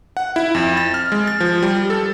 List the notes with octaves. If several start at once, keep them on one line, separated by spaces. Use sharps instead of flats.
F#5
E4
F2
A6
F6
G#3
A6
F3
G3
A4